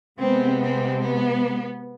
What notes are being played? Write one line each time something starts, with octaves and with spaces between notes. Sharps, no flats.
C3 G#3 B3 C4
C4
B3